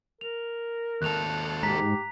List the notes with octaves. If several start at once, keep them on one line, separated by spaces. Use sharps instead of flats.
A#4 F7
D#2 A4 F#6 F7
G#2 G4 A#5 B6